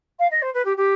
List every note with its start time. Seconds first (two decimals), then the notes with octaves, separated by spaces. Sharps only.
0.19 F5
0.31 D#5
0.42 C5
0.54 B4
0.65 G4
0.77 G4